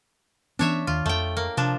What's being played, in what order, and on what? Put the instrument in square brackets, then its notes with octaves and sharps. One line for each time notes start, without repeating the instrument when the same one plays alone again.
[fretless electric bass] E3 B3 C#4 [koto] D4 C#5 E5
[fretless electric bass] D#2 D#3 [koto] F4
[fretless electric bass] F2 [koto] A3 G5
[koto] A#3
[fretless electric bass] C3 [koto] F3 D4